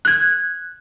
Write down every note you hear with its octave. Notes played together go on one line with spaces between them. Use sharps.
F#6 G#6